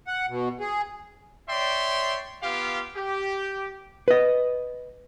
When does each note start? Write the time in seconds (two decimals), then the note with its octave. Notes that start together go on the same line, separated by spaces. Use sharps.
0.07 F#5
0.29 B2
0.60 G#4
1.49 C#5 D5 E5 G5 C6
2.43 B3 F4 G4 F5
2.96 G4
4.08 B4 D#5